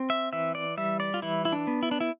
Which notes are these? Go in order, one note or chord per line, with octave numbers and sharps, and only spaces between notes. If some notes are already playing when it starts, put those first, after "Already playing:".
Already playing: C4
E5
E3 E5
D5
G3 E5
D5
F4
E3 E4
E4
D4
B3
E4
D4
E4